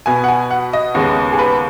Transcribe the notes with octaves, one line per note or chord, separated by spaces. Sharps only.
B2 B3 G#5
F#5
G#5
F#5
D#5
D#2 C#3 G#3 B3
G#4
B4